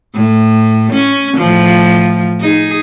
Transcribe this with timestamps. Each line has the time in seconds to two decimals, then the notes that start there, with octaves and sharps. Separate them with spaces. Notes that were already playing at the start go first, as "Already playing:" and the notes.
0.14 A2
0.93 C#4
1.37 A2 F3
2.40 D#4 G#4